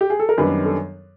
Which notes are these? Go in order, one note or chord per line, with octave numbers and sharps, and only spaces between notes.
G4
G#4
A4
A#4
F#2 D#3 G3 B3 D4 B4
A4